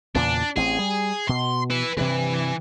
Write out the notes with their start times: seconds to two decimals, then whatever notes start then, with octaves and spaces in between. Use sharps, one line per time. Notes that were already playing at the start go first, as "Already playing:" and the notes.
0.15 E2 A#2 C#3 D4
0.57 A1 C4 G#4
0.79 G3
1.29 B2 C6
1.71 E4 B4
1.97 G2 C3 E3